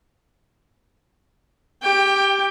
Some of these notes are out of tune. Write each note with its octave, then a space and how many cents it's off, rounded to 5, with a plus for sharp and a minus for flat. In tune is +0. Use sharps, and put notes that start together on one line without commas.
G4 +0 G5 +20